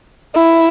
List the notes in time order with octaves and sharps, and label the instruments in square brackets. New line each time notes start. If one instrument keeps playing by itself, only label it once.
[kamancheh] E4